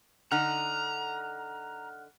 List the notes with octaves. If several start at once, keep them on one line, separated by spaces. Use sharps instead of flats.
D3 D#4 F#5 A#5 F6 F#6